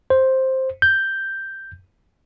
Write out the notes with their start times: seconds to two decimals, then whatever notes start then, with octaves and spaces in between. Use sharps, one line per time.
0.10 C5
0.82 G6